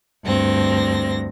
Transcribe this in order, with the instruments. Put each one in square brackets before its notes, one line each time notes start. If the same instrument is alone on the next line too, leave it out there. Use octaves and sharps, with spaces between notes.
[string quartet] D2 G2 C4 A#6